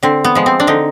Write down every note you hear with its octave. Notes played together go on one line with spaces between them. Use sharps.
D3 C4
B3
F3 G#3
C4
D4
D3 D#4